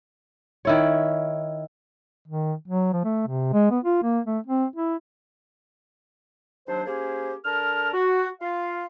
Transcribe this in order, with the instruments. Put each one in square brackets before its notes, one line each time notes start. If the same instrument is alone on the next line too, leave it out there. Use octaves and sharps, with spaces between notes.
[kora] D#3 E4 C#5
[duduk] D#3
F#3
F3
A3
C3
G#3
B3
F4
A#3
A3
C4
E4
[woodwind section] D#2 F#3 D4 C5
A#3 C#4 G4 G#4 C5
D3 A#4 A5 F6
F#4
F4 F5